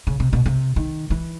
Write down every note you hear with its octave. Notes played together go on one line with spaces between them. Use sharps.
C#3
C3
B2
C3
D#3
E3